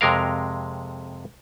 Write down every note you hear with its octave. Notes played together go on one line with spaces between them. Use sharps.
F2 C3 G#3 A#4 F5